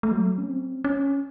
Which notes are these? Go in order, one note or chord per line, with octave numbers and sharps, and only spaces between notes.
A3
F#3
C#4
C4
C#4